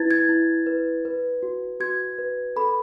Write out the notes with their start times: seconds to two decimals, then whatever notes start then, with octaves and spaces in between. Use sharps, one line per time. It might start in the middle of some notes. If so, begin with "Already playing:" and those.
Already playing: E4 B4 G#6 A6
0.11 G#6
0.29 E4
0.66 B4
1.05 B4
1.43 F#4
1.80 F#4 G#6
2.18 B4
2.56 A4 B5